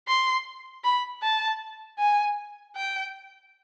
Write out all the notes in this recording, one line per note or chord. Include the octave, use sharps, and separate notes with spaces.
C6
B5
A5
G#5
G5